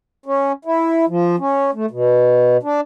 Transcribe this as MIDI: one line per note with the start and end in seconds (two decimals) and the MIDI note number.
0.26 0.52 61
0.65 1.05 64
1.09 1.36 53
1.39 1.71 61
1.74 1.86 57
1.91 2.57 47
2.63 2.81 62